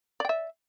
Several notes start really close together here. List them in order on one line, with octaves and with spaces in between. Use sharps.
D5 G5 E5